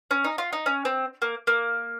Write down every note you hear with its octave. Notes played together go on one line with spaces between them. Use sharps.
C#4
D#4
F4
D#4
C#4
C4
A#3
A#3